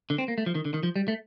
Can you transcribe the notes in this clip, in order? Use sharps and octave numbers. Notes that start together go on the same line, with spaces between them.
D3
C4
A#3
A3
F3
D#3
D3
D#3
F3
G3
A3